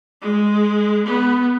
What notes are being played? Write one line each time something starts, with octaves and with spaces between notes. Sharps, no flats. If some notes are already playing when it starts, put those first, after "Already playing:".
G#3
B3